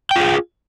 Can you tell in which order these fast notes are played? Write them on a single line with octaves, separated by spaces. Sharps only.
G5 F4 G#4